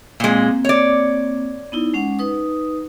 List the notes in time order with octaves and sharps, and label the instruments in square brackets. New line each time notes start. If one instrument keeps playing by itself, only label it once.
[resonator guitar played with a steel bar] A#2 G#3 [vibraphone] A#3 C4
[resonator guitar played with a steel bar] C#5 D5
[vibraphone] B3 D#4 E4
G#3 C#4 F#5
D#4 B4 D#6